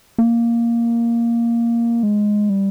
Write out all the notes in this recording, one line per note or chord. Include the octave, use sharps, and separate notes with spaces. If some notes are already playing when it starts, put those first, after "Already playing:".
A#3
G#3
G3